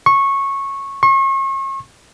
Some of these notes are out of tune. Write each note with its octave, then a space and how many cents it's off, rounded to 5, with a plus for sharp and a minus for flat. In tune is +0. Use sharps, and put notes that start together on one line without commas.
C#6 -15
C#6 -40